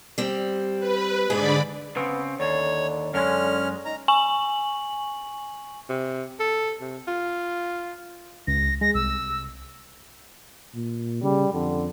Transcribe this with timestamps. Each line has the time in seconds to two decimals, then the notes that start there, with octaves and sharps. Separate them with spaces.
0.18 G3 C4
0.80 B4
1.30 G#2 D3 G#4 D5 B5
1.96 C#3 B3 C4
2.40 D#2 D3 C#5
3.14 F#2 D3 G#3 C#4 F6
3.85 D#4 A#5
4.08 G#5 C#6 F#7
5.89 C3
6.40 A4
6.81 C3
7.07 F4
8.47 C#2 A#6
8.81 G#3 A#6
8.95 C2 E6
10.75 A#2
11.23 C#3 G3
11.53 F2 D3